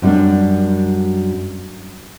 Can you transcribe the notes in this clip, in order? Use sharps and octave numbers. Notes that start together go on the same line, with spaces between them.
F#2 G3 D4